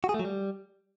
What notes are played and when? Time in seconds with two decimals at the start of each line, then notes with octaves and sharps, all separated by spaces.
0.04 F#4
0.09 G#4
0.14 A3
0.19 F#3
0.25 G3